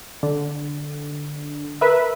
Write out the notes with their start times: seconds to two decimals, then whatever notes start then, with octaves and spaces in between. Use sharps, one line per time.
0.23 D3
1.81 A#4 B4 E5